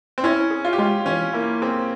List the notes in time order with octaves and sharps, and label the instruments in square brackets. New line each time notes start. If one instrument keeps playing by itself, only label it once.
[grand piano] C4
[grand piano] C#4 [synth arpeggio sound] E4
[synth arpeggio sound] G#4
[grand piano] F4
G4
[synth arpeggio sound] G#3 [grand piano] F4
[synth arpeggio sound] E3 [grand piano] C#4
[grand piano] A#3 [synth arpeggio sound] E4
[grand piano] C4 [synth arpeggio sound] G#4